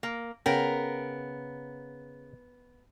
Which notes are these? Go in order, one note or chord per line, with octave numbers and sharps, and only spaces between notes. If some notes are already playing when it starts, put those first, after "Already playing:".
A#3
C#3 B3 A#4 G5